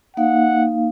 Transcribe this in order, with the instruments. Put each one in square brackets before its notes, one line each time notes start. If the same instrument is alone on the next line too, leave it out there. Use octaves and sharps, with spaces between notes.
[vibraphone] A#3 D#4 F5 [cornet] F#5